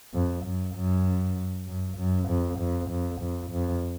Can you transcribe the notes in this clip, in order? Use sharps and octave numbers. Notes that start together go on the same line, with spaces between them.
F2
F#2
F#2
F#2
F#2
F2
F2
F2
F2
F2